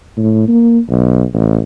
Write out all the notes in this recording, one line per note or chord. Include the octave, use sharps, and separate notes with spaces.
A2
A#3
B1
A1